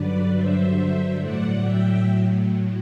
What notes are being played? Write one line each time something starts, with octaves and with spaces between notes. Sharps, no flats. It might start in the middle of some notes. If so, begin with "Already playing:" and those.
Already playing: G2 D3 F#3 B4 D5
C5 E5
A2 F#3 D5 F#5
E5 G5